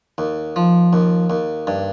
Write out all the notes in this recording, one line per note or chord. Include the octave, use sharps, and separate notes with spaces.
D#2
F3
D#2
D#2
G2